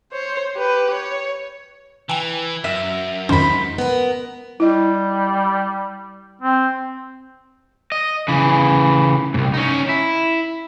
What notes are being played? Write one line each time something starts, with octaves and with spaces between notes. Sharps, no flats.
C5 C#5
G4 B4
C#5
E3 G5 G#5
F#2 E5
F2 G#2 D#3 C#4 D#4 C5 B5
B3 A#4
G3 E4 D#5
C4
D#5
C#3 E3
C2 G#2
C#4 D#4
E4